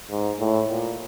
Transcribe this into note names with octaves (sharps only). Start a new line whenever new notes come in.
G#2
A2
A#2